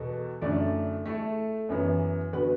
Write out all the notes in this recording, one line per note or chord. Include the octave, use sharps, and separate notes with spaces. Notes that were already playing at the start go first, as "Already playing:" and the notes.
Already playing: E2 B2 B3 F#4 A4
F#2 D3 A3 E4 D5
A3 E4 A4
F#2 E3 B3
D3 B3 F#4 B4